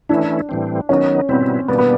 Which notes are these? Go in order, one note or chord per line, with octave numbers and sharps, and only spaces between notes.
E3 A3 C#4 D4 E4
A2 E3 G3 C4
D#3 F#3 B3 C#4 D#4
B2 G3 B3 C4 E4
B2 G3 A#3 B3 D4
B3